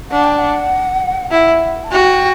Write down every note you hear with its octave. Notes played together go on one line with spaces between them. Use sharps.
D4 F#5
G5
F#5
E4 F#5
A5
F#4 G5